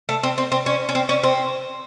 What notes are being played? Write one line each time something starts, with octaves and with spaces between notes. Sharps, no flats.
A3
C4
C4
C4
C#4
C#4
C4
C#4
C4